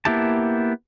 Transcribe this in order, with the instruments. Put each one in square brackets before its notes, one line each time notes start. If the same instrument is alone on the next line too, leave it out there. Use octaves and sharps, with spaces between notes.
[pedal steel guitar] A#3 B3 E4 G4 A5